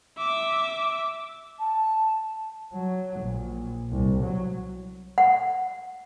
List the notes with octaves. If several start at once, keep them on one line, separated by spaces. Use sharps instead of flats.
E5 D6
A5
F#3
A#1
C2
F#3
F#5